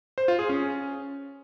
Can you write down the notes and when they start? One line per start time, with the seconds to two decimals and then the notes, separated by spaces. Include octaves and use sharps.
0.18 C5
0.28 F4
0.39 G#4
0.49 C#4